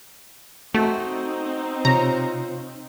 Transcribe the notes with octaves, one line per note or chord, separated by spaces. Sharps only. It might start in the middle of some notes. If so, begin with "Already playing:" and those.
A3 C4 D#4 F#4
C3 F4 C5 C#5 A#5